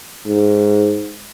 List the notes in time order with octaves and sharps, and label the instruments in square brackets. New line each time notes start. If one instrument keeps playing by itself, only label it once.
[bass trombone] G#2